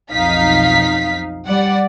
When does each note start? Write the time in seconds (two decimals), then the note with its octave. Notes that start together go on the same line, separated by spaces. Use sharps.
0.12 B1 F2 D#4 F5 B6
1.48 G3 D5 F#5